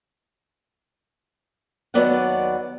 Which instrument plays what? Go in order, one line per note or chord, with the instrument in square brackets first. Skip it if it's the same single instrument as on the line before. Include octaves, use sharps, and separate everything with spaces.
[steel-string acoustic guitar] D#2 F#3 B3 D5 D#5 F#5